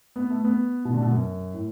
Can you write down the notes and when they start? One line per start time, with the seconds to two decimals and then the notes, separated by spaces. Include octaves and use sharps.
0.16 B3
0.30 A3
0.44 B3
0.85 B2
0.93 D3
1.02 B2
1.11 F#2
1.54 A2